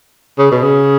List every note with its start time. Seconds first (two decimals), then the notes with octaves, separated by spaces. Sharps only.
0.39 C#3
0.52 B2
0.63 C#3